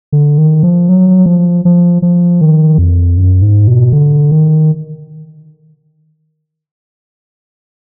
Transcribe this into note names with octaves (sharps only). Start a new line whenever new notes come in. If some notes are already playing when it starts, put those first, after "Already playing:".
D3
D#3
F3
F#3
F3
F3
F3
D#3
F2
F#2
G#2
B2
D3
D#3